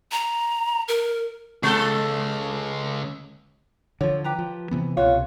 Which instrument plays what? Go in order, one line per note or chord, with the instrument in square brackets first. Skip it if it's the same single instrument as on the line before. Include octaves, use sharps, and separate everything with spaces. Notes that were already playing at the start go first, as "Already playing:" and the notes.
[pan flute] A#5
A#4
[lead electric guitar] C#2 [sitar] G#3 A4
[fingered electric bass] D3 F3 [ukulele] C#5
[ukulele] G4 B4 A#5
[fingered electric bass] F3
C3 E3 B3
[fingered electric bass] C2 B2 [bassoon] F4 [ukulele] F#4 C#5